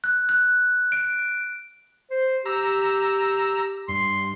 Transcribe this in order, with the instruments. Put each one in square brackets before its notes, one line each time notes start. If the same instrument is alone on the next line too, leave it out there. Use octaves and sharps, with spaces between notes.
[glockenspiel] F#6
F#6
D7
[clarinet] C5
[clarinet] G4 [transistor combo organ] A#5 E6
[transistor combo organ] G2 [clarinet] C6